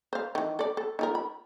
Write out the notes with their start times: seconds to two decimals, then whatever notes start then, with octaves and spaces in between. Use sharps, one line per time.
0.13 C5 F5
0.35 D#3 E3
0.59 A4 D5
0.77 A4
0.99 D#4 F4 A#4
1.15 B5